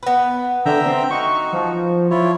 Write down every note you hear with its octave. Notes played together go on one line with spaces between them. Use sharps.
B3 B4
D3 E5 G5 A#5
C4
D#4 F#4 C#6
F3
F3 E4 F4 C#5